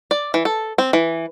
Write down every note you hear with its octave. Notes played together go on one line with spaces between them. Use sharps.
D5
E3
A4
C4
E3